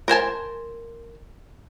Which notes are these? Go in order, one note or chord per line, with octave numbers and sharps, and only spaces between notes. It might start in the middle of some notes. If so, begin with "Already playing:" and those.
A#4 C5 G#5 A5